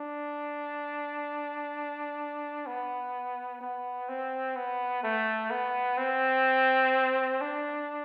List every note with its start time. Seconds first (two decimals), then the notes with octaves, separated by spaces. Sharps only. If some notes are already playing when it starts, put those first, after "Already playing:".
Already playing: D4
2.66 B3
3.61 B3
4.09 C4
4.56 B3
5.03 A3
5.50 B3
5.97 C4
7.41 D4